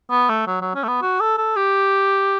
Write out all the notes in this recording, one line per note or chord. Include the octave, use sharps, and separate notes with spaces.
B3
A3
F#3
F#3
C#4
A3
B3
F#4
A4
A4
G4